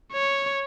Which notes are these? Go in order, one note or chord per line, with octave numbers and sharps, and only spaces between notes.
C#5